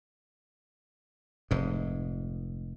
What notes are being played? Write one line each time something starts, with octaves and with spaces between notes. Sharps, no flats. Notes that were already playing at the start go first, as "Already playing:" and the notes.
F1 G#2